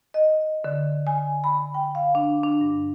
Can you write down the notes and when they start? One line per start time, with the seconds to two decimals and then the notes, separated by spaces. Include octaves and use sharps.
0.14 D#5
0.64 D3
1.07 G#5
1.44 B5
1.74 G5
1.95 F5
2.15 D4
2.43 D4
2.61 G2